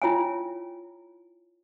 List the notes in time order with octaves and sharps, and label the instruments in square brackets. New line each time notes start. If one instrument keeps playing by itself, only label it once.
[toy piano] E4 F4 C#5 G5 G#5